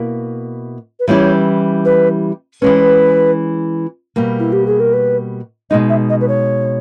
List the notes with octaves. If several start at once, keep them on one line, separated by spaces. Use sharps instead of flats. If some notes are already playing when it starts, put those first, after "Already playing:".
Already playing: B2 A#3 E4
B4
E3 G3 C#4 E4 G4 C#5
B4
E3 G#3 C#4 B4
B2 G3 A#3
E4
G4
G#4
A#4
B4
B2 G#3 D#4 D#5
E5
D#5
B4
C#5